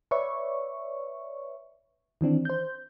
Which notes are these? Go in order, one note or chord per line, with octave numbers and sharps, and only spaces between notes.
B4 C#5 D5 E5 C#6
D#3 E3 C4 D4
C5 G6